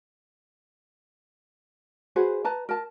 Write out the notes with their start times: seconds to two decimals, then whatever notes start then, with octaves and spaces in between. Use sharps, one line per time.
2.16 F#4 G#4 B4 C5
2.45 B4 A5 A#5
2.69 A#4 A5